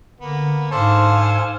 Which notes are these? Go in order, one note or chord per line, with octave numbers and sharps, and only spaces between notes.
D3 A#3 B3
G#2 D4 A4 C5 F5 G#5